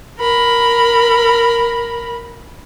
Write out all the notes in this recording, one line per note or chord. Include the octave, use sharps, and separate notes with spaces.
A#4 B5